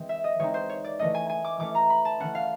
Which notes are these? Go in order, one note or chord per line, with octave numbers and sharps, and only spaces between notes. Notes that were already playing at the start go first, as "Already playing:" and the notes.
Already playing: E3 G#3 C4
E5
D#5
E3 G#3 C4 D#4 C#5
C5
C#5
D5
E3 A3 C#4 D#5
G#5
G#5
D6
E3 A3 C#4 D6
A#5
B5
A5
E3 A3 C#4 F#5
F5